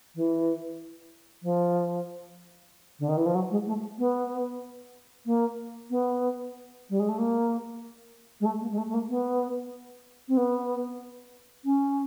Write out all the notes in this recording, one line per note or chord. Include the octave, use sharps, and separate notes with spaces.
E3
F3
D3
D#3
E3
F3
F#3
G#3
A3
B3
A#3
B3
G3
G#3
A3
A#3
G#3
A3
A#3
G#3
A3
A3
A#3
B3
C4
B3
C#4